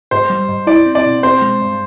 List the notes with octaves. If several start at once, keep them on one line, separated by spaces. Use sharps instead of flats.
G#2 C5
G3
G#2
E4 D5
C4
D5
B2
C4 C5
G#3
G2